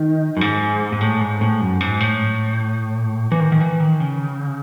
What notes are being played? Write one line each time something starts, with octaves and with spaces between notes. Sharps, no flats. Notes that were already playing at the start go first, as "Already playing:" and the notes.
Already playing: D#3
F#2
G#2
G#2
A2
G#2
A2
F#2
G#2
A2
E3
D#3
D#3
E3
D#3
C#3